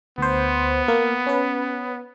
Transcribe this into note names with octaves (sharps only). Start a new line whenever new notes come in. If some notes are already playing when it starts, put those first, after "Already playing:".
D2 B3 C5
A#3 A#4
C#4 B4